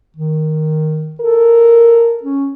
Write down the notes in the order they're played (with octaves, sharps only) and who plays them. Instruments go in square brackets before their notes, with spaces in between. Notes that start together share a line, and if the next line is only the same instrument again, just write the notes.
[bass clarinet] D#3
[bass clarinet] A4 [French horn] A#4
[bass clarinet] C#4